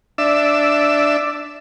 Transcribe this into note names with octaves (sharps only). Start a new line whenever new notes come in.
D4 E5